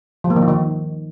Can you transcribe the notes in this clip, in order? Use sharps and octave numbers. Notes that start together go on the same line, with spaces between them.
F3
A#3
D#3
D#4
D#3